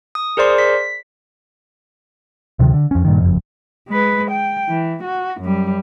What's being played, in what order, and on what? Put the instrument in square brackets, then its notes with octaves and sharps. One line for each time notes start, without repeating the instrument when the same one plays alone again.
[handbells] D#6
G#4 A#4 C5 D5 C6
B6
[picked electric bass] D2 C3 D#3 F#3
D3
F2 C#4
G2 A#2 D#3
F#1 F2
[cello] G#3 B4
G5
E3
F#4
F#2 G3